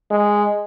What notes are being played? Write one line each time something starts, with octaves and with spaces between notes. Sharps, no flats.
G#3